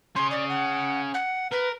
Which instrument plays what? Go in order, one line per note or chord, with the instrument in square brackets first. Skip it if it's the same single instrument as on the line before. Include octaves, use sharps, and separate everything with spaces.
[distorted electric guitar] C#4 G#4 [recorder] C6
[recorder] D5
F#5
F#5
[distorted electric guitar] A#4 [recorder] B4